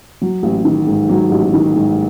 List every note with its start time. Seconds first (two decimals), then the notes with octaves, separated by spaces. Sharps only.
0.22 F#3
0.43 A1
0.65 D#3
0.87 G#2
1.09 F#3
1.32 A1
1.54 D#3
1.76 G#2